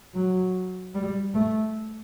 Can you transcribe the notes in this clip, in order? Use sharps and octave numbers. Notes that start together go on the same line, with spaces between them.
F#3
G3
A3